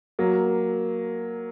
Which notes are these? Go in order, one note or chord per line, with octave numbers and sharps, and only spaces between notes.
F#3 A#3